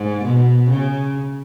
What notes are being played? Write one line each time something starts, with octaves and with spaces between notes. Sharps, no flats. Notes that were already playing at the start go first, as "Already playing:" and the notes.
Already playing: G#2
B2
C#3